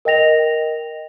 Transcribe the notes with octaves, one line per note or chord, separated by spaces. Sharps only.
A#4 D#5 G5 A#6 F7